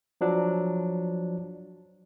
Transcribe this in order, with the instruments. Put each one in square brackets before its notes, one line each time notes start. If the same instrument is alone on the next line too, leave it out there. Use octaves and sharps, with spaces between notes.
[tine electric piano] F3 F#3 D4